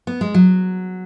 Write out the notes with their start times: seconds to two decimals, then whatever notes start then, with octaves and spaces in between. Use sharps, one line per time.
0.07 B3
0.21 G#3
0.34 F#3